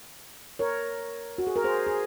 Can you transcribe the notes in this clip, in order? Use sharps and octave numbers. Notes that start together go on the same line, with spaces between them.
A#4 C#5
F#4
G#4
A#4
G#4 C5
G#4